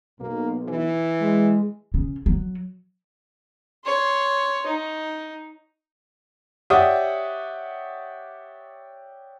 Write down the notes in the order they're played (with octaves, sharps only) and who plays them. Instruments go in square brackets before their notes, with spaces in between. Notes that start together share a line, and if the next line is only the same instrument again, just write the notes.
[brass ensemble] B1 [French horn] A#3
[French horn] E3
[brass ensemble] G#3
[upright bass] C#3
F#3
[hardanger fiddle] C#5 C6
D#4
[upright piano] G4 C#5 D5 E5 F#5 D#6